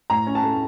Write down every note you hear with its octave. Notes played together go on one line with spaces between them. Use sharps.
A2 A#5
C#4
A5
A3